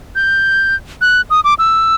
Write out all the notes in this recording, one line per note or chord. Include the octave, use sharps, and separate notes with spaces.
G6
F#6
D#6
D6
E6